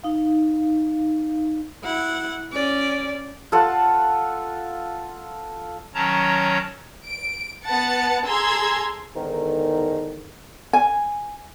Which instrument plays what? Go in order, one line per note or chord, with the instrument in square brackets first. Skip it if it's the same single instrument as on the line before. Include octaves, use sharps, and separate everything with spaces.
[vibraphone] D#4 F5
[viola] E4 F#5
C#4 D5
[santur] F4 A4 F#5
[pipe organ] D#3 F#3 C#4 C#5 A5 A#5
[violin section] D7
B3 F#5 A5 A6 C#7
G#4 A4 A#5 C6 E6 G#6
[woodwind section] E2 G#2 D3 D#3
[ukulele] G#5